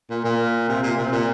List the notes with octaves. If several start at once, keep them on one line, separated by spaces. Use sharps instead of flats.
A#2
A#2
C3
A#2
C3
A#2